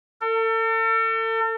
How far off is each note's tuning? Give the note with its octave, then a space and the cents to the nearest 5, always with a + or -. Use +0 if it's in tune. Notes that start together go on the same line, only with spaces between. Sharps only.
A4 +40